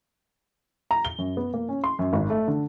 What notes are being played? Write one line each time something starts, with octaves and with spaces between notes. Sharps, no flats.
A#5
G7
F#2
B3
A#3
C#4
C6
F#2
G#1
A3
D3